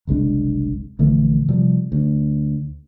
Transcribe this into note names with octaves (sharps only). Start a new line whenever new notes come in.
F#1 C2 G#3 D4
A#1 D3 E3 A3
C3 F3 G3
D2